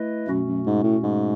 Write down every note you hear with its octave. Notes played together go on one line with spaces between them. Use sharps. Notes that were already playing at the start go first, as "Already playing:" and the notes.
Already playing: A3 E4 B4 D#5
F#2 B2 A3 C#4 F#4
F#2
G#2
A2
G#2